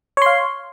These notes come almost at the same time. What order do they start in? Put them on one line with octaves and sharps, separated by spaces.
C#5 C6 F5